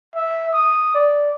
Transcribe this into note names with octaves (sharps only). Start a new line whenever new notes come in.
E5
D#6
D5